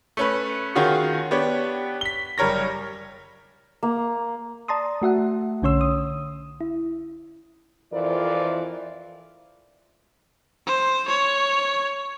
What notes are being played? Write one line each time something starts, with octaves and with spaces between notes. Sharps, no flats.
A3 C#4 B4
D#3 C#4 F4 F#4 G#4
B3 D4 G4 C#5
B6 G7
F#1 G3 A#4 C#5 A#6
A#3
D5 A5 A#5 C6 D#6
A3 F#4 E5 F#5
B1 D3 C#4 C#5 C6 E6
D#6
E4
F2 E3 F4 A#4 C5 D5
C5
C#5